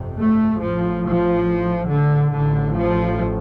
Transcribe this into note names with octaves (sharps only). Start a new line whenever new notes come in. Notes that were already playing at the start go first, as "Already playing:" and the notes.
Already playing: G1 F2 C3
A3
A1 A2 F3
F3
D3
A1 A2 D3
F3